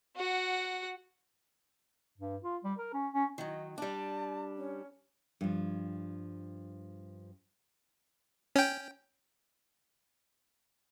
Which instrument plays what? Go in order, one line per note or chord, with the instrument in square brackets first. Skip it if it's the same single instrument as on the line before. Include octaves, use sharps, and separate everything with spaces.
[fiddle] F#4 F#5
[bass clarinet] G2
F4
G3
A#4
C#4
C#4
[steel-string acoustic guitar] D#3 F#3 [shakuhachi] D#5
[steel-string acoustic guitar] G3 D4 [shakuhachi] A5
[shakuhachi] C#4
[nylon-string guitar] G2 F3
[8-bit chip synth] C#4 G5